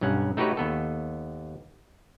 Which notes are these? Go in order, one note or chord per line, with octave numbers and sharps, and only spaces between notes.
B1 G2 C#4 F#5
A3 D#4 F#4 G4 B4 C#5
D#2 B3 A4